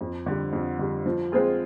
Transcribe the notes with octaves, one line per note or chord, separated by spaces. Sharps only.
F2
D3 G3
F2
D3 G3
F3
G#3 C4 F4 G#4